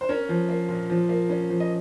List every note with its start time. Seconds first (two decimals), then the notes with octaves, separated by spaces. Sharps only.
0.01 C5
0.09 C#4 A#4 C#5
0.29 F3
0.49 A#3
0.69 A#2
0.90 F3
1.09 A#3
1.29 C#4
1.50 F3
1.60 D#5